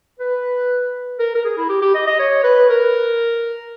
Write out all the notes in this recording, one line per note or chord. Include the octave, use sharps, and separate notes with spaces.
B4
A#4
A#4
G#4
E4
G4
G4
D#5
D#5
C#5
B4
A#4